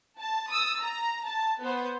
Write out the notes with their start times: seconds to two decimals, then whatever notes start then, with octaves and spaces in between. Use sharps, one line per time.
0.20 A5
0.51 D#6 E6 A6
0.82 A#5
1.27 A5
1.63 B3 C5